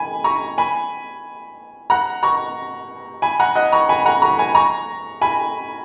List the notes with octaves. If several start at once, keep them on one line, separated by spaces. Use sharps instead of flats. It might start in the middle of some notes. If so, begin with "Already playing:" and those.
Already playing: G#5 B5
A#5 C#6
G#5 B5
F#5 A#5
A#5 C#6
G#5 B5
F#5 A#5
D#5 F#5
A#5 C#6
G#5 B5
F#5 A#5
A#5 C#6
G#5 B5
A#5 C#6
G#5 B5